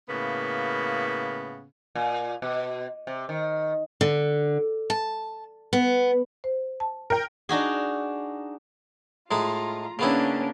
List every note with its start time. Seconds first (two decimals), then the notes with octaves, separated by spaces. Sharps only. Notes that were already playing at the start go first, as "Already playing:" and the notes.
0.08 A2 C#3 A#3 B3
1.95 A#2
2.42 B2
3.07 C3
3.29 D#3
4.01 D3
4.90 A5
5.73 B3
6.44 C5
6.80 A5
7.10 A#4 G5
7.49 D4 D#4 F#4 G#4
9.31 A2 G#3 D#4 F4 A#5
9.99 C#3 A#3 B3 C#4 D4 E4